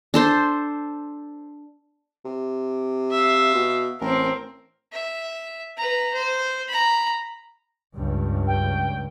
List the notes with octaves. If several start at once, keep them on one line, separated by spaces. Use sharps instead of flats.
D4 A4 C5
C3
E5 F5
B2
A1 C4 A#4
E5
B4 A#5
C5
A#5 B5
C#2 G2
G5